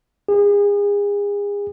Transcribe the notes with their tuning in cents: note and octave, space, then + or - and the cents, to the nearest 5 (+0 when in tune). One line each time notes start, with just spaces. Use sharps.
G#4 -35